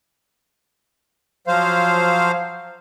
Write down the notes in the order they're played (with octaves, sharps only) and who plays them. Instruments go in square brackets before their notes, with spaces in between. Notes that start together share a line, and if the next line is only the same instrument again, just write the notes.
[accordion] F3 F#3 C5 F5